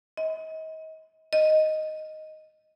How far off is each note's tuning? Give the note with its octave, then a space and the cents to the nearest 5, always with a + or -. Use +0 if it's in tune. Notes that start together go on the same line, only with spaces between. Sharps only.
D#5 +35
D#5 +0